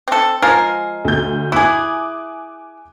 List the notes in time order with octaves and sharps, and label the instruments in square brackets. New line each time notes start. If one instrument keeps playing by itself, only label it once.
[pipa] C4 A4
[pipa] F3 G#3 A#4 [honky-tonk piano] G#5 C7
[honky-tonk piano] D2 G6
[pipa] E4 G#4 [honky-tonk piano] G#5 D6 F#6